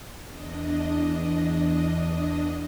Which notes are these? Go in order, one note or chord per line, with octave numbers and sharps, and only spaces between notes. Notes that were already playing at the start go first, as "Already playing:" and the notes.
E2 D4 D#5